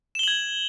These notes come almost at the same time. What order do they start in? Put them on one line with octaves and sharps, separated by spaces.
E7 G7 F#7 G#6